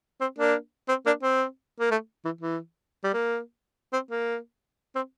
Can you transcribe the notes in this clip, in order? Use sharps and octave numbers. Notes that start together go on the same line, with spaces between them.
C4
A#3 D4
C4
A#3 D4
C4
A#3
A3
E3
E3
G3
A#3
C4
A#3
C4